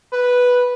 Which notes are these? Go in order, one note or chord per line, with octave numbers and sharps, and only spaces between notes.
B4